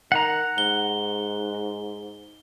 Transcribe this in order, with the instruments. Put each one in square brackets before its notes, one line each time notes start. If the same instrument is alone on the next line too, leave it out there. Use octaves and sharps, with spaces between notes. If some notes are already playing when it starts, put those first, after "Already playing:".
[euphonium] D#3 [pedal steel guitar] F#5 A#5
[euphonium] G#2 [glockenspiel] G7